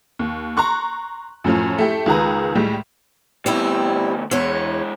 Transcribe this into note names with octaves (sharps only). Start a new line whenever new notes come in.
D#2
A#5 C6 C#6 F#6
F#2 A2 F3 C#4
A3 E4 G4
C#2 D#3 G#4 B4 A#5
A2 G3 G#3
D2 G3 B3 C4 E4
E2 G#3 E4 C#5